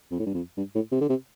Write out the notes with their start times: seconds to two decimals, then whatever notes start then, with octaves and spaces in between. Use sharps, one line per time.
0.11 F2
0.19 A2
0.26 G2
0.34 F2
0.57 G2
0.75 A2
0.92 C3
1.01 D3
1.09 C3